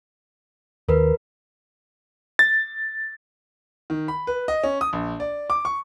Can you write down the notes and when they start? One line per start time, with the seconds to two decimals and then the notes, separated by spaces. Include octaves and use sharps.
0.89 D#2 A#4 B4
2.39 A6
3.90 D#3
4.08 B5
4.27 B4
4.48 D#5
4.63 C#4
4.81 D#6
4.93 A#1
5.20 D5
5.50 D6
5.65 C#6